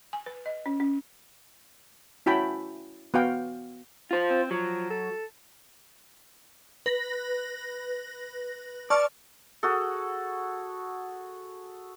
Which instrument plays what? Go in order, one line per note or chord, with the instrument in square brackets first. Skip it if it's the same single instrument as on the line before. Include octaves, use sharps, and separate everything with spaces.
[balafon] G#5
B4
D#5
C#4
C#4
[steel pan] C#4 E4 F#4 G5 A5 B5
B3 F#4 F5 G5
[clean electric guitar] F4 C5
[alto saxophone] C4
[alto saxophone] F3 [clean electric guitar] F#3
[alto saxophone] A4
[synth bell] B4 A#6
[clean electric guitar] D5 [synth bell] A5 C#6 F6
[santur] F#4 G#4 A4